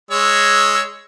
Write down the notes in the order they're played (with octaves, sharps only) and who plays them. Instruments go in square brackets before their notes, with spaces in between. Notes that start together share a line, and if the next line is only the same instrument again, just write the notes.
[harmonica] G#3 C#5 E6